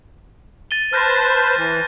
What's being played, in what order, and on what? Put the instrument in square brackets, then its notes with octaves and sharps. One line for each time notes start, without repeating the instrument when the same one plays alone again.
[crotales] A6 D#7 G7
[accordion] B4 C5 A5 [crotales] F6 G6 A#6
[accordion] E3